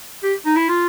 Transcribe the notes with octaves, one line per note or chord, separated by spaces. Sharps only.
G4
D#4
E4
F4